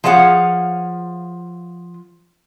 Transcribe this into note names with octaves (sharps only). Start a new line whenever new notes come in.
F3 G#4 C#5 F5 F#5